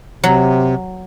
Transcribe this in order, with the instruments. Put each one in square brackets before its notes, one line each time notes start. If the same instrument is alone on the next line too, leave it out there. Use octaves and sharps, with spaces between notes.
[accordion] C3 [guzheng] F#3